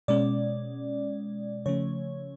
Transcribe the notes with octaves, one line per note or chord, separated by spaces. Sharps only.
B2 G#3 C#4 D5
C#3 F3 A3 C#4 C#5